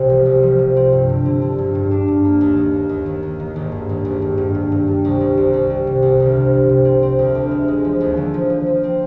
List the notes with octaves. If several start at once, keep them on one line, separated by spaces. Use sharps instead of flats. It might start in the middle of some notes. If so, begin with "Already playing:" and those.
Already playing: C2 C3 C4
F3
C2
F3
C3
C4
G2
D3
D3
D3
G2
G2
D4
G2
A#3
D#2
D#2
A#3
D#2
D#2
A#3
D#3
G#1
G2
G#1
G#1
G2
G2
G2
G2
G3
C2
C2
C2
C2
G3
C3
C2
D2
C3
F3
C3
C4
C4
D2
D2
G#3
G#3
F3
D#2
D3
F3
F3
F3
C4